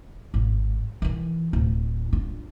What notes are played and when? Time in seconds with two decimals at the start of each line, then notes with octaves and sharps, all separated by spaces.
0.34 G#1
1.02 D#3 E3
1.53 D1
2.13 D4 F4